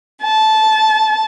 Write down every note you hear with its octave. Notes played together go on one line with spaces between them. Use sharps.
A5